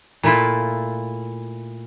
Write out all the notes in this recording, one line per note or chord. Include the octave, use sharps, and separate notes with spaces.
A#2 A3 E4 F4